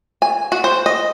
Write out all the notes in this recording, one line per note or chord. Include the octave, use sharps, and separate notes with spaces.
G#5
F#4
C5
D#5